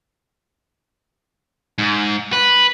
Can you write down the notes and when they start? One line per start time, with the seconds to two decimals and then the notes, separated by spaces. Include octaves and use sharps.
1.78 G#2
2.33 B4